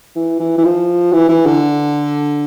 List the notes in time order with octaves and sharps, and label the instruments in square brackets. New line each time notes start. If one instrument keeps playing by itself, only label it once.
[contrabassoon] E3
E3
E3
F3
E3
E3
D3